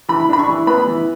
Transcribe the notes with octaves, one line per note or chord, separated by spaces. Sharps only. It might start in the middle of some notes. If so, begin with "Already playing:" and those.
E3 B5
D4 B5
C#6
E3
B3 B5
E3